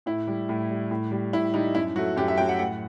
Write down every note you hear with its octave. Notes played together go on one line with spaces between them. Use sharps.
A2 E4
G3
A2
G3
A2
G3
A2 E4
G3 D#4
F#2 E4
F#3 A3 F#4
F#2 G4
E5
F#3 A3 G5
F#5
A2 F#5